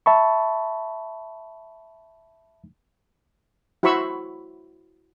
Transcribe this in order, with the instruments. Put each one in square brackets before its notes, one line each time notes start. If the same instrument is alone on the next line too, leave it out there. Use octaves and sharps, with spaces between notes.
[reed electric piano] E5 A5 B5 C#6
[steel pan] E4 F#4 C5 B5 C#6 E6